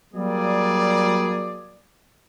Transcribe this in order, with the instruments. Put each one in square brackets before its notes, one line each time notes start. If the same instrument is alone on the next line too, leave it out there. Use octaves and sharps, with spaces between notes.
[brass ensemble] F#3 G3 A#3 G#4 D5